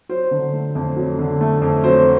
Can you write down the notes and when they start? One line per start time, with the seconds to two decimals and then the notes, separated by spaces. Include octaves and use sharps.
0.09 F#3 C5
0.31 D3
0.53 A3
0.75 F2
0.96 F#3
1.18 D3
1.41 A3
1.62 F2
1.84 F#3 C5